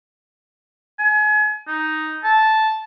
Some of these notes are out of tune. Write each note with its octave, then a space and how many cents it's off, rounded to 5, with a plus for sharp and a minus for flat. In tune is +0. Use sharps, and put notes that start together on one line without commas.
G#5 +35
D#4 +0
A5 -10